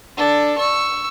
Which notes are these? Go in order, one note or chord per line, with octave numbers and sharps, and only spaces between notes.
D4 A4
C#6 E6